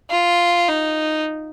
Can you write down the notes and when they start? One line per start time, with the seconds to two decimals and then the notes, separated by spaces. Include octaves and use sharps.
0.11 F4
0.68 D#4